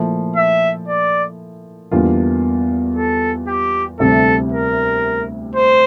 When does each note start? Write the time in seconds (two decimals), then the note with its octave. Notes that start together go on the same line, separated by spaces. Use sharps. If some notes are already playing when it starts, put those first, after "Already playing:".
Already playing: A#2 F3 A3 E4
0.36 E5
0.88 D5
1.91 E2 D3 G3 A#3 F4
2.96 A4
3.48 G4
3.99 D2 C3 G3 C4 E4 A4
4.52 A#4
5.56 C5